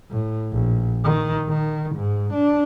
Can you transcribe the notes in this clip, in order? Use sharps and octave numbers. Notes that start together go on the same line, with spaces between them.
A2
A#1
D#3
D#3
G#2
D4